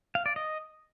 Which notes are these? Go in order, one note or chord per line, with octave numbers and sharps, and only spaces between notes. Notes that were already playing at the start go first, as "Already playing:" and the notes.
F5
D5
D#5